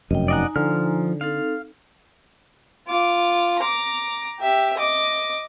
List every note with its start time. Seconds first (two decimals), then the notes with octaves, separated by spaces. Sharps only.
0.11 F1 F#2 D#5 G5
0.28 D#4 D5 D#5 F#5 G#5 A#5
0.56 D3 F3 F6
1.21 C4 D#4 A4 F5
2.88 F4 D6
3.59 A#5 D6
4.40 G4 E5
4.77 D#5 D6